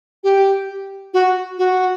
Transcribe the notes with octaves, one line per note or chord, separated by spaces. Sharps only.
G4
F#4
F#4